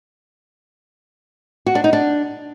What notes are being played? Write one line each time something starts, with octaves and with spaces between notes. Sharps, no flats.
F#4
D4
D#4
D4